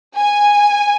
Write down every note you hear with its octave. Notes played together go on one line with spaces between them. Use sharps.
G#5